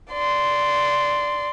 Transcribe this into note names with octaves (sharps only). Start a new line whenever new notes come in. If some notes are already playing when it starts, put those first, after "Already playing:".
D5 C6